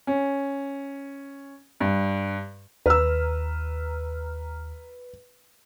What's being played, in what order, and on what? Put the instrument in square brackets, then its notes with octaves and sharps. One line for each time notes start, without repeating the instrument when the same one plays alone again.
[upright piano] C#4
G2
[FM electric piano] D#2 A#5 F6 [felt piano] B4 E6